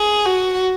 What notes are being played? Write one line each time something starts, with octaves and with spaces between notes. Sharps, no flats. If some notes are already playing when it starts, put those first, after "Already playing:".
Already playing: G#4
F#4